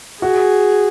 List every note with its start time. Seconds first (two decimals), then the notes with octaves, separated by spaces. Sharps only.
0.22 F#4 G#4